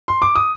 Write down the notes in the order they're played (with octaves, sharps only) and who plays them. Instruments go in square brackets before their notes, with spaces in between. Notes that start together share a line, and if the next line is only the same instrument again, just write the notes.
[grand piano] C6
D6
D#6